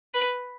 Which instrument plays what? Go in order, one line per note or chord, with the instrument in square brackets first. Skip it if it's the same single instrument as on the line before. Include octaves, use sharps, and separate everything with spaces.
[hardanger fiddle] B4